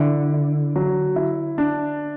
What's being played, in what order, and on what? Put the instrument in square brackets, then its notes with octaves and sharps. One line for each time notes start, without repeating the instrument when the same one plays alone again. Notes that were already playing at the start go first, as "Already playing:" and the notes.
Already playing: [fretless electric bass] D3 [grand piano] E4
[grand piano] E4
F#3
E4
D4